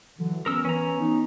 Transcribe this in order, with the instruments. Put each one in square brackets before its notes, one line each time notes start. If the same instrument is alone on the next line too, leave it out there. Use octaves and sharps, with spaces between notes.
[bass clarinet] D3 [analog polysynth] E3 F#3
[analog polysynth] B3 [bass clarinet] C#4 [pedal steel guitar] A#4 E6
[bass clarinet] E3 [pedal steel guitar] C#4 A#5
[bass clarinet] D#4